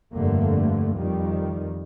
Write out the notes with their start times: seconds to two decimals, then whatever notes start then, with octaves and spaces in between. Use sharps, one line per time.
0.14 F1 G2 D3 A3 A#3
0.96 F2 D#3 G3